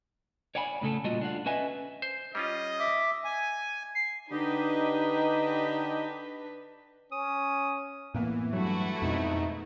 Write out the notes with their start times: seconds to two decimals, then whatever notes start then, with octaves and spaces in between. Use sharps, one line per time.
0.55 C#5 D5 F#5 G#5 B5
0.81 A2 C#3 A3 A4
1.04 A#2 G3 F4 F#4 A4 D#5
1.21 D4 F4 F#5
1.46 C#4 B4 D#5 E5 G#5
2.02 C5
2.35 G3 C#4 F4 D#5
2.79 E5 D6
3.24 G#5
3.95 C7
4.31 D3 D4 D#4 G4 B4 D#5
7.12 C#4 D#6
8.14 A2 E3 A#3 B3
8.53 G2 F#3 A3 E4 F#4
9.02 F2 G#2 B2 D#4